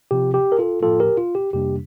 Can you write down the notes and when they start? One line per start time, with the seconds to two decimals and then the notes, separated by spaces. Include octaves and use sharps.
0.11 C3 F3 C4 F4 G4
0.34 G4
0.52 A#4
0.59 F4 A4
0.82 A2 F3 A#3 F4 A4
1.00 G4 A#4
1.17 F4
1.35 G4
1.53 F2 C3 G3 A#3 D4 G4